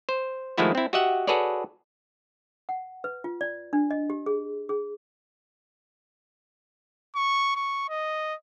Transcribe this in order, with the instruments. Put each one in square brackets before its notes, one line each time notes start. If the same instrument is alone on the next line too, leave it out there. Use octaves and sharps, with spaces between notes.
[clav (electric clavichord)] C5
D#3 F3 G#3 A3 E4 F#4
C4 E4
F#4 G4 D#5 E5 F#5
F#4 G#4 A4 B4 C#5 D5
[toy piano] F#5
B4
F4
D5
D4
D#5
G4
G#4
G#4
[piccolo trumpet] C#6
C#6
D#5